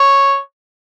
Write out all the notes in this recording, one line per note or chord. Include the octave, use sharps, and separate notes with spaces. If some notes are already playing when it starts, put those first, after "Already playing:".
Already playing: C#5